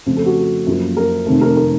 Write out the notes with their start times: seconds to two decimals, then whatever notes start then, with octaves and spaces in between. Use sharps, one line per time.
0.06 F2 C#3 A3
0.16 A4
0.26 F#4
0.66 F#2 F3 A#3
0.97 A#4
1.26 F1 F2 D#3 A3
1.41 A#4
1.57 A#4